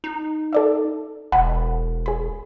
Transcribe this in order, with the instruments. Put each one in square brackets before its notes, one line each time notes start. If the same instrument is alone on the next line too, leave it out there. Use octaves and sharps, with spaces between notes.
[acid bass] D#4
[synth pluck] A4 D5 E5
[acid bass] E1 [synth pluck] F#5 A5 B5
[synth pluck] G#4 B5